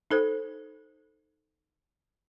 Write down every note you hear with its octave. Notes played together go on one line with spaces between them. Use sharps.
D#4 A4 C5